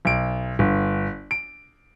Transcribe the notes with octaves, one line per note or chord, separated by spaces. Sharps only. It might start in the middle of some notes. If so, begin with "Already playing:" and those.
B1 D7
G1
D7